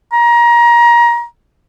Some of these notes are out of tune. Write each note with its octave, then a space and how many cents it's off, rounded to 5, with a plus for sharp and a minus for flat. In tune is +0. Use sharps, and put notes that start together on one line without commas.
A#5 +25